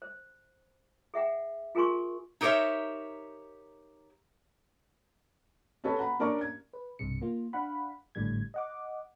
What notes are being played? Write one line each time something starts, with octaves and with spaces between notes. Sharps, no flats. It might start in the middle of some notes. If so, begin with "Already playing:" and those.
C5
G#4 E5 F#5 G5
F4 G#4 A#4 G#5 C6 C#6
D#4 G4 A#4 C5 C#5 E5
C#4 F#4 A4 B4 C#5 A5
F#5 A#5 B5
C#4 D4 A#4 D5 A#5 C#6
G#6
B4
B1 G2 C3 C#7
A#3 F4
D4 F5 F#5 B5
G#1 A2 D3 G3 G#6
D#5 F#5 D6